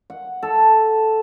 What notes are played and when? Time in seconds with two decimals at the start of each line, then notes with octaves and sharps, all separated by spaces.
0.10 F#5
0.43 A4